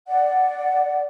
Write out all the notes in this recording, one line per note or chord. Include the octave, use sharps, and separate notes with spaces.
D5 F#5